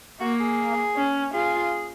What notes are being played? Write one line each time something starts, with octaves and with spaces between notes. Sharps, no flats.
A#3 F#4
G#4
C#4
F4 G#4